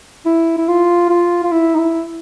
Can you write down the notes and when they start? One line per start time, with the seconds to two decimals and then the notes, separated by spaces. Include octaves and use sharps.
0.26 E4
0.58 E4
0.68 F4
1.10 F4
1.44 F4
1.51 E4
1.75 D#4
1.79 E4